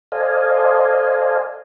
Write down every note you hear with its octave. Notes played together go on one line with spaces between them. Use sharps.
A4 C5 D5 D#5 F5 G#5